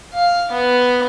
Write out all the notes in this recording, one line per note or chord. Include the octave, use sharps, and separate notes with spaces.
F5
B3